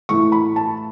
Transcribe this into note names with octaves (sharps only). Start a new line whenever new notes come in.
A2 E3 A3 C#6
B5
A5